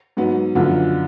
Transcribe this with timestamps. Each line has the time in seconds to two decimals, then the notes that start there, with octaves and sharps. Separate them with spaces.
0.17 G#2 F#3 B3
0.55 F#2 D3 F3 B3 F4